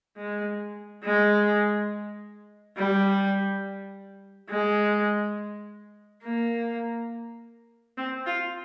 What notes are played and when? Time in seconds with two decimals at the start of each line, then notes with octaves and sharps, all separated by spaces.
0.17 G#3
1.03 G#3
2.77 G3
4.50 G#3
6.23 A#3
7.97 C4
8.26 F4